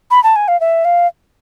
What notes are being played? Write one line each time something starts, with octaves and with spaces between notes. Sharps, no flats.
B5
A5
G#5
F5
E5
F5